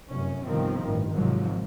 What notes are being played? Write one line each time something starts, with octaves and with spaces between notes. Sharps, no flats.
F1 F#2 C#4
G1 C2 D#3 F3 C4
A1 G2
G#1 G#2 C3 F3 F#3